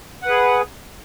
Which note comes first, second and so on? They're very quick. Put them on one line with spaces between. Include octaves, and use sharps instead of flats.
F#5 B4 G#4